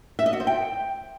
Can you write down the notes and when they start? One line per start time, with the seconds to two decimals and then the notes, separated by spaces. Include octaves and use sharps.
0.19 E5
0.26 D#5
0.33 F#4
0.40 C5
0.47 G5